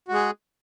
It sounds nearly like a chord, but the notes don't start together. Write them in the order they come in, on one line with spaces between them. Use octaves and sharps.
F#4 G#3 G#4